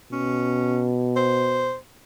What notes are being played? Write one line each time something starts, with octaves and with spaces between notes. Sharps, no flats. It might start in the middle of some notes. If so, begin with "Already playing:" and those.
B2 C#4
C5